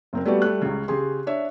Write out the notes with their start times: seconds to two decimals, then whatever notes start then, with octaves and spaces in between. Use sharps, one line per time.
0.13 F#1 C4 A#4
0.25 G3 A3 B3 F#4 G4 D5
0.42 G3 A3 F#6
0.62 C#2 C#3
0.88 C#3 G4 G#4 C6
1.27 D4 C#5 E5